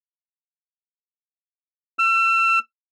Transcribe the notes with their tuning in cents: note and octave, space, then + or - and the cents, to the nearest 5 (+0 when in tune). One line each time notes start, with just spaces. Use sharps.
E6 +35